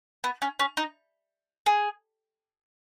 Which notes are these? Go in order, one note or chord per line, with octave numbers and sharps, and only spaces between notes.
B3
C#4
C#4
D#4
G#4